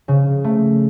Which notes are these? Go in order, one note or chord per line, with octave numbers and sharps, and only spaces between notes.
C#3
A3